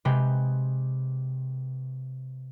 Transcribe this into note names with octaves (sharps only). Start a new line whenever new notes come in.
C3 G#3 G4 B4